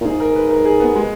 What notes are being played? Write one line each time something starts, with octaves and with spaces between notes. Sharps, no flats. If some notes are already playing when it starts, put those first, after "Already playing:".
A#2
G#2 G#4
A#4
B4
A#4
G#4
B3
G#3